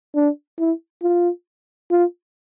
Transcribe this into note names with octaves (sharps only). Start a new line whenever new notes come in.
D4
E4
F4
F4